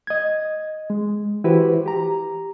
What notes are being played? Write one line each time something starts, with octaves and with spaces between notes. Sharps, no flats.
D#5 G#6
G#3
E3 E4 F#4 G4 B4 C5
G4 A#5